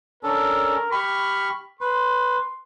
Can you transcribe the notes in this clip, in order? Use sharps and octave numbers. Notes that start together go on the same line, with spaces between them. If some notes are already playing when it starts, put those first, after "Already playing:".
C#4 D4 A4 A#4
G4 B5 C#6 F6
B4 C6